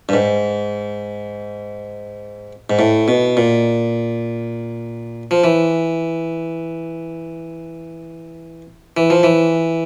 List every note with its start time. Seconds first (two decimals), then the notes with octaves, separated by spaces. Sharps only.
0.09 G2
0.13 G#2
2.70 G#2
2.79 A2
3.08 B2
3.37 A#2
5.31 F3
5.44 E3
8.97 E3
9.10 F3
9.23 E3